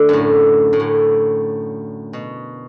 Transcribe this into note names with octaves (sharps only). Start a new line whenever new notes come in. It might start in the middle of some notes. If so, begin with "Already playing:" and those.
Already playing: D3 A3
F#2 A2
A2
F#2
B2